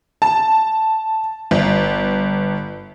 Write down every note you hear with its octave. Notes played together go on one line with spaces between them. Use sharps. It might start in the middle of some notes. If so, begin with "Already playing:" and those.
A5
G1